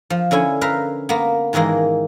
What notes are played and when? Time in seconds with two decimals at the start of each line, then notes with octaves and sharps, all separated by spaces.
0.10 F3
0.31 D3 C#4 E4 G#5
0.61 A#4 B4 E5 F5
1.09 A#3 B3
1.53 G#2 D#3 E3 G#3 A#3